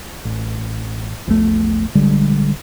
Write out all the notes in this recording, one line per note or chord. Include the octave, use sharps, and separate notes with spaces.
A1
A#1 E2 D3 A3
A#1 D3 G3 G#3